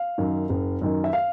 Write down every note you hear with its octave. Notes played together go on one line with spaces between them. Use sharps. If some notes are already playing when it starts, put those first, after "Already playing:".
Already playing: F5
F#2 D#3
F#1
F#2 D#3
E5
F5